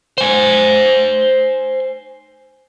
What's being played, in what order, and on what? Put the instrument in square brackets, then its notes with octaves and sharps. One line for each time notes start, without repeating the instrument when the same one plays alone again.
[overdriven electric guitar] C5 G#5